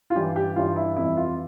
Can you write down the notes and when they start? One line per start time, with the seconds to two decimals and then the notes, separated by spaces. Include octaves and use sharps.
0.10 F4
0.15 G2 E3 G4
0.36 G4
0.56 G2 E3 F4
0.76 E4
0.96 F2 E3 E4
1.17 F4